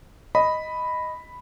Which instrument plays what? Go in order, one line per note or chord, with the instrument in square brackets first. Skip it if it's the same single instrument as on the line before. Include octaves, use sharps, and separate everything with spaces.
[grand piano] D#5 [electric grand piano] B5